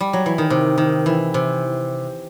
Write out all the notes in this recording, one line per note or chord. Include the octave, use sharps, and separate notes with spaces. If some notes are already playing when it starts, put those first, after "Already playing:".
G3
F#3
E3
D#3
C3
D#3
E3
C3